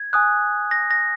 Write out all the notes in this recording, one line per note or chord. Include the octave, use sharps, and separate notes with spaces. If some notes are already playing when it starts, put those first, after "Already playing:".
Already playing: G#6
G#5 D#6 F#6
A#6
A#6